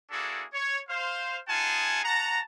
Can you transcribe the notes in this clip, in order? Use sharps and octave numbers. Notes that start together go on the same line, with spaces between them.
A#3 D4 E4 F#4 G#4 A4
C#5
C5 F5
D#4 F4 G#4 F#5 G#5 A5
F#4 F#5 A5 A#5